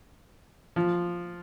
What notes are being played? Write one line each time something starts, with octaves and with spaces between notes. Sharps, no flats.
F3